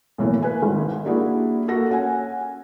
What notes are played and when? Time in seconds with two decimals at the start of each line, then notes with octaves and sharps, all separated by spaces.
0.18 B1 A2 E3 A#3
0.43 A#4 B4 G#5
0.63 G#1
1.05 G3 A#3 D4 E4 F#4 G#4
1.68 A#3 F#4 A4 A#6
1.89 C#4 F#5 G#5